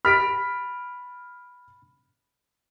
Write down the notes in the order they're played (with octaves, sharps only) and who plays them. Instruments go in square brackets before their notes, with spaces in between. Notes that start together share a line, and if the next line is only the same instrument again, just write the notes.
[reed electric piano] B5 [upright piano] F6 B6 D7